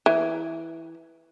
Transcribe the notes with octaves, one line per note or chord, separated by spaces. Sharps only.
E3